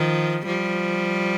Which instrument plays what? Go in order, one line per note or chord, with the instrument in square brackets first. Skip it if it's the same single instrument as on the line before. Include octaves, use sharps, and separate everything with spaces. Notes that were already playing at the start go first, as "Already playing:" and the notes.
Already playing: [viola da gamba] D#3 F3
F3 G3